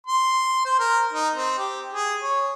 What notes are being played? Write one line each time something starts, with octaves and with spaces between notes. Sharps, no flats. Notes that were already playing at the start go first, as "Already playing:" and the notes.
C6
C5
A#4
D#4
C4
G4
G#4
C#5